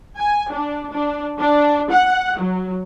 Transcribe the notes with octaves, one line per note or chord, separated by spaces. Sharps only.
G#5
D4
D4
D4
F#5
F#3